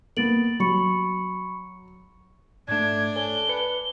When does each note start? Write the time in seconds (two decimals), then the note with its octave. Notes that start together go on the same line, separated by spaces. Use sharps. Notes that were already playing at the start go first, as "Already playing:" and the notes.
0.17 A#3 B3 A6 D7 F#7
0.60 F#3 B5 C#6 C#7
2.68 G#2 A3 D4 G#6
3.16 A4 C#5 G#5 G7
3.49 B4 C#7